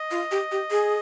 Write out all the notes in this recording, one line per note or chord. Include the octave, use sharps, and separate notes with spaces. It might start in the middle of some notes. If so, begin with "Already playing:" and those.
Already playing: D#5
F4
G4
G4
G#4